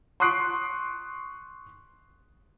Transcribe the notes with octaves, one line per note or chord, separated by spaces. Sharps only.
C6 C#6 D#6 F#6 C7 D7